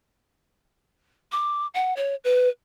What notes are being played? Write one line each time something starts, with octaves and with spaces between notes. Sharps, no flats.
D6
F#5
C#5
B4